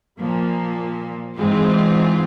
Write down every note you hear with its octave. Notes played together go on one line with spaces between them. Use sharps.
A#2 F3 A#3
G#2 E3 G#3 C4 F4